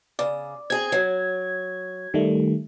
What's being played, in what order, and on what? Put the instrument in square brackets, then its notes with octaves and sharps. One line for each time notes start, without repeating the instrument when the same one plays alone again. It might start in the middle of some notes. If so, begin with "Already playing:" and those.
[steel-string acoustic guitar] C#3 [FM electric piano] D5
[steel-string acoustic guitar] C4 G#4 [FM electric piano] G#6
[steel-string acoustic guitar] F#3
[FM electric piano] D#3 G3 A3